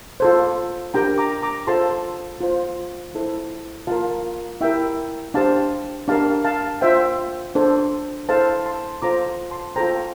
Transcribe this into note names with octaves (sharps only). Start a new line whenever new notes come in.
F4 A4 C5
D4 G4 A#4 G5 A#5
A#5 D6
A#5 D6
F4 A4 C5 A5 C6
F4 C5
E4 A4 C5
F4 A#4 F5 A5
E4 G4 A#4 E5 G5
D4 G4 C5 F5 A5
D4 G4 A#4 F5 A5
F5 A5
F4 C5 E5 G5
D4 A4 C5
E4 A4 C5 F5 A5
A5 C6
F4 A4 C5 A#5 D6
A5 C6
F4 A4 C5 G5 A#5